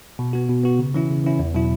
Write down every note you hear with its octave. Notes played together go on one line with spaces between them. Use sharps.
B2
B3 F#4
B2
B3 F#4
C#3
E3 C#4 E4
C#3
E3 C#4 E4
E2
B2 F#3 E4